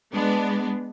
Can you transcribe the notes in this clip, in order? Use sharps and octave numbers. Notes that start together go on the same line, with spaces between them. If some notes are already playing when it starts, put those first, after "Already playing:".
G#3 B3 D4